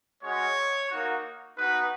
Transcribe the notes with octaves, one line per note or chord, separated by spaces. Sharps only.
G#3 C#4 F#4 C#5
A#3 D#4 F#4
B3 D#4 F#4 B4